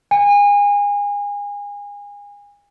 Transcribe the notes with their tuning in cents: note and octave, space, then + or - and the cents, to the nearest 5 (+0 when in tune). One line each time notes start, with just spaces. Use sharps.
G#5 -30